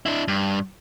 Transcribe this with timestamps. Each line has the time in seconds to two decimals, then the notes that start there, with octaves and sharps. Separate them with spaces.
0.06 D4 E4
0.28 G2